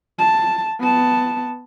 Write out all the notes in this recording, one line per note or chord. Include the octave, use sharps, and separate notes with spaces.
A5
B3 A5